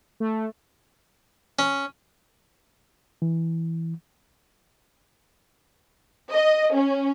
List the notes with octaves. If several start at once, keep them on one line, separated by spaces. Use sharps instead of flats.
A3
C#4
E3
D#5
C#4